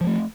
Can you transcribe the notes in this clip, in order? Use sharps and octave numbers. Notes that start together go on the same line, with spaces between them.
F3 G3 A3